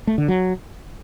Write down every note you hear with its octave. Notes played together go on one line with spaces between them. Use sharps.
A3
D3
F#3